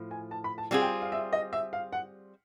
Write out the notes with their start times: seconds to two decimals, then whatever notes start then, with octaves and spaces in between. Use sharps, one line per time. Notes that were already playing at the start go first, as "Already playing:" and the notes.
Already playing: A2 F3
0.11 G#5
0.31 A5
0.44 B5
0.58 A5
0.71 G3 C4 F4 G#4 F#5
0.82 G5
1.02 F5
1.12 E5
1.33 D#5
1.53 E5
1.73 F5
1.92 F#5